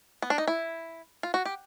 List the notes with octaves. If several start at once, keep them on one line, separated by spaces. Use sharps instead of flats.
B3
D4
D#4
E4
F4
F#4
G4